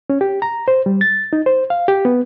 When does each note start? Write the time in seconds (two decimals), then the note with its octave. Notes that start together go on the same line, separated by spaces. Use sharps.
0.10 C#4
0.21 G4
0.42 A#5
0.68 C5
0.86 G3
1.01 A6
1.33 D#4
1.46 C5
1.70 F5
1.88 G4
2.05 B3